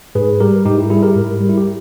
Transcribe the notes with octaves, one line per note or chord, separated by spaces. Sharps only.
G#2 G#4 B4
G3 G4 A#4
G#2 D#4 G4
E4
G3 E4 G#4
G4 A#4
G#2
G3
E4
G4